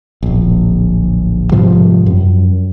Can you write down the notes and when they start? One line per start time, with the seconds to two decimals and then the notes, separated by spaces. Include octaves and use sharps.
0.23 D1 A#1
1.52 G#2 C3 F3 G3
2.06 F#2